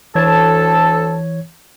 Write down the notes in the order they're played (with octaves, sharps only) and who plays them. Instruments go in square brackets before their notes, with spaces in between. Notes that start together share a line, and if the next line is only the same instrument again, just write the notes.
[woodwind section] D2 A4 A5 [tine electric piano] E3 C#5 G#6